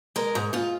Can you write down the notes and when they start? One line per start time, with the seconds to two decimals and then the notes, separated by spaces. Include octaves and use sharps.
0.16 G#3 A#4
0.35 G#2
0.53 G#2 F4